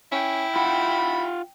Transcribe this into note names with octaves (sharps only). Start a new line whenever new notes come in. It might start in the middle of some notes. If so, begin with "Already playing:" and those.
C#4 E4 G5
F4 F#5 B5